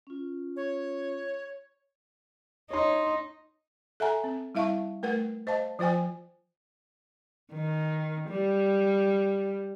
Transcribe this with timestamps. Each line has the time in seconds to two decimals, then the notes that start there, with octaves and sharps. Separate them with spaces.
0.07 C#4 F4
0.56 C#5
2.71 D#4 C#5 C6
4.00 A4 E5 F#5 G#5 A#5
4.24 C4
4.55 G3 E4 E5 F5 A5 C#6
5.03 A3 A#4 B4 F#5
5.47 C5 D#5 F5 A5
5.79 F3 F4 C5 G5 G#5
7.52 D#3
8.29 G3